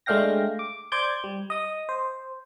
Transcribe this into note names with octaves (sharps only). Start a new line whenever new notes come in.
G#3 A3 D4 F5 G5 A#6
D6
C5 D5 D6 G6 G#6
G3
D#5 D#6
C5